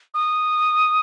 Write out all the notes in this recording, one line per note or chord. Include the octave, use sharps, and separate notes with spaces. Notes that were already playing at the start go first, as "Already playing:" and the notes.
D#6